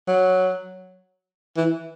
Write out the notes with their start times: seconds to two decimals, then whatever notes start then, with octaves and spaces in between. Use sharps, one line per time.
0.08 F#3
1.57 E3